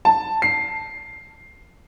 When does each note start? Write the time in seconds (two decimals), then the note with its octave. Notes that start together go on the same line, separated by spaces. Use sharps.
0.05 A5
0.42 C7